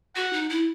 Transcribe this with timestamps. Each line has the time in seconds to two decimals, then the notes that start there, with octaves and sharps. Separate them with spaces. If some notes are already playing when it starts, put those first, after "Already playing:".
0.16 F#4 F#5
0.33 D#4
0.49 E4